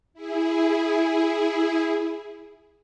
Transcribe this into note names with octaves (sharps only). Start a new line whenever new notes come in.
E4 G#4